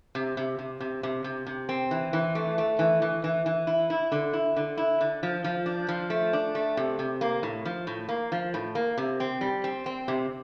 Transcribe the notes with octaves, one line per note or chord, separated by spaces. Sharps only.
C3
C3
C3
C3
C3
C3
C3
C4
E3
E3
A3
A3
E3
E3
E3
E3
E4
E4
D3
E4
D3
E4
D3
F3
F3
D4
F3
A3
D4
A3
C3
C3
A#3
A2
F3
A2
A#3
F3
A2
A#3
C3
C4
G3
C4
C4
C3